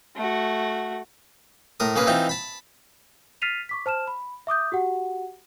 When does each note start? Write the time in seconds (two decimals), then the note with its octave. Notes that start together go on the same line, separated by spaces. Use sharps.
0.16 A3 F#4
1.80 A2 A#4 D#6
1.96 C#3 A#3 G#4 B4
2.07 E3 C4 D#4 F4
2.29 A5 B5
3.42 F6 A6 B6 C7 D#7 F7
3.69 C#6 D6 B6
3.86 C5 A5 F6 E7
4.08 B5
4.47 E5 D6 D#6 G6
4.72 F#4 G4 F#5